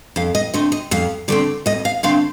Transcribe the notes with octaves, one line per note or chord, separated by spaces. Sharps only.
F2 F5
D#5
D3 A3 C4 D#5
D#5
F2 F5
D3 A3 C4 D5
F2 D#5
F5
D3 A3 C4 F5